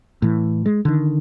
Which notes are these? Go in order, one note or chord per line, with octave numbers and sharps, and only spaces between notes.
A2 E3
G#3
D3 D#3